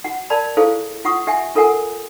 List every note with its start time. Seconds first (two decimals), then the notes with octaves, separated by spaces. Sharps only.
0.04 F#4 F#5
0.30 A#4 D5 A5 B5
0.57 E4 G#4 A4 C5 F5
1.05 F4 F#5 C#6 D#6
1.27 G4 E5 F#5 G#5
1.55 F4 A4 A#4 F#5 G#5 D#6